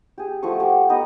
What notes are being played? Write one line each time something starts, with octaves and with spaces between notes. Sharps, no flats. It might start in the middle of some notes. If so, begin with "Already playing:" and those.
G4 G#4
F3 A3 F#4 C#6
G4
B3 D#4 G4 D#5